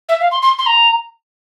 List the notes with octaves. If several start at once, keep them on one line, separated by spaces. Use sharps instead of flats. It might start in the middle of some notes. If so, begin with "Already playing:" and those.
E5
F5
C6
C6
C6
A#5